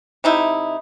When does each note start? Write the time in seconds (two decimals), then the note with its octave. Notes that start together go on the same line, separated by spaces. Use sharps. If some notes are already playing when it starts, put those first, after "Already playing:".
0.24 C3 D#4 E4